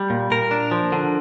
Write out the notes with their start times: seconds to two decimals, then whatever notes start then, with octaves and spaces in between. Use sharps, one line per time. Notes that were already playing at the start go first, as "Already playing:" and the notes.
Already playing: G3
0.10 A#2
0.31 A#2 A#4
0.51 D4
0.71 F3
0.92 D3